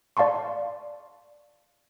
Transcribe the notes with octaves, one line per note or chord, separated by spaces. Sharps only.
D5 F5 A5 C6 C#6